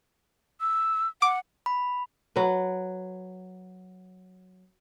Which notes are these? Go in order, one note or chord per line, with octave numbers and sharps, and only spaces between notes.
E6
F#5 D6
B5
F#3 B4